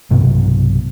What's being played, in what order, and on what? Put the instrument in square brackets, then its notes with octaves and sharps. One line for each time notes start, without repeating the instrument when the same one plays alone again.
[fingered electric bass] B1 G2 C3 B3